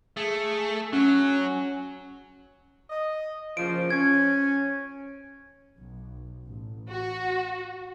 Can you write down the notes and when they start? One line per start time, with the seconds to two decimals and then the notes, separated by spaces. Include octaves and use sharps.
0.17 A3 G#4
0.93 F#3 C#4
2.90 D#5
3.57 A#2 C#3 F3 D7
3.91 C#4 G#6
5.79 B1
6.46 A1
6.90 F#4